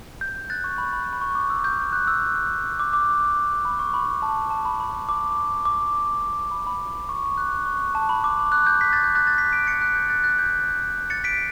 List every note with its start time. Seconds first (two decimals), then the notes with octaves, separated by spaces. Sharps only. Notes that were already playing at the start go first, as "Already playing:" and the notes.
0.21 G6
0.50 F#6 A6
0.64 C#6
0.78 B5
0.93 B5
1.13 B5
1.21 C#6
1.35 D6
1.50 E6
1.64 G6
1.92 F#6
2.07 E6
2.79 D6
2.93 D6
3.65 B5
3.79 C#6
3.94 B5
4.22 A5
4.50 A5
4.65 B5
4.80 B5
5.09 D6
5.65 D6
6.51 B5
6.67 B5
7.09 C#6
7.23 D6
7.38 F#6
7.52 F#6
7.66 C#6
7.95 A5
8.09 B5
8.24 D6
8.52 F#6
8.67 G6
8.81 B6
8.93 A6
9.04 G6
9.15 F#6 A6
9.27 A6
9.38 G6 B6
9.53 B6 D7
9.66 A6 C#7
9.81 F#6 A6
9.95 G6
10.10 F#6 A6
10.24 F#6 A6
10.38 G6 B6
11.10 A6 C#7
11.24 B6 D7